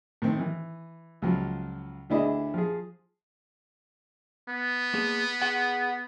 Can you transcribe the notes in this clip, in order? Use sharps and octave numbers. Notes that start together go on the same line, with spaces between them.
A2 D#3 C4
E3
C#2 F3 F#3
D2 D4 E4 G#4 D#5
F3 G#4
B3
A#3 G#4
G#4 F#5